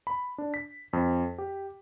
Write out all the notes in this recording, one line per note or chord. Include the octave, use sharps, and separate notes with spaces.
B5
D4
B6
F2
G4